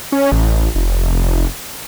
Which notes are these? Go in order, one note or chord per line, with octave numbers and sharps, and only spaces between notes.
C#4
A1
F1